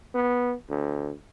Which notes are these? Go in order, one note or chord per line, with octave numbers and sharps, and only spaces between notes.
B3
D2